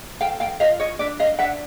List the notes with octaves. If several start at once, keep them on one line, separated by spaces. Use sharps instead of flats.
A4 F5 G5
F5 G5
F4 D#5 F5
C#5 D#5
D4 D5 E5
D#5 F5
D4 E5 F#5